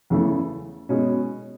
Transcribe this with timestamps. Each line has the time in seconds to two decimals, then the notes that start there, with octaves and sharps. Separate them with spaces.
0.10 E2 C#3 E3 A3
0.89 B2 G#3 C#4